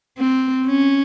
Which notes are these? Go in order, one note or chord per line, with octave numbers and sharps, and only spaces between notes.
C4
C#4